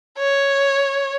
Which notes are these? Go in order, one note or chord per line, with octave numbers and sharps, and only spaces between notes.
C#5